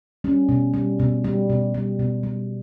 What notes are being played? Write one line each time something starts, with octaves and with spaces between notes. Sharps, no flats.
G3 C#4
B2
G3
B2
G3
B2
G3
B2
G3